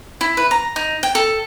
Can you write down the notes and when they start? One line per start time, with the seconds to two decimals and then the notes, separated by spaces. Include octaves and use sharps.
0.21 E4
0.37 B4
0.51 A#5
0.76 D#4
1.03 G5
1.15 A4